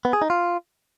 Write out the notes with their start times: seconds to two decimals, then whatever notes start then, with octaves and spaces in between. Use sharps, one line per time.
0.05 B3
0.13 G#4
0.22 D#4
0.30 F4